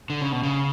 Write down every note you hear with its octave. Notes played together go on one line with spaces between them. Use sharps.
D3
C#3
B2
C#3